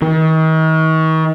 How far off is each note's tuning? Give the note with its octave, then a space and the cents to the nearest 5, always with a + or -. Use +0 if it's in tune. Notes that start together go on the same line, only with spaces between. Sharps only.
D#3 +40